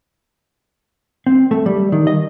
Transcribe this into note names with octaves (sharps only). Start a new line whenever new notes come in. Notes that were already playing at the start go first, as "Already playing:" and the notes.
C4
A3
G3
D#3
D#5